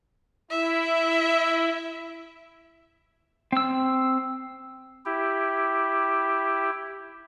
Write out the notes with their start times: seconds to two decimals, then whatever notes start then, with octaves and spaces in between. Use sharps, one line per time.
0.51 E4 E5
3.52 C4 E6
5.06 E4 G4